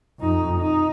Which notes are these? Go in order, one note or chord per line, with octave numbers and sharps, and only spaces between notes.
F2 D#4
D#4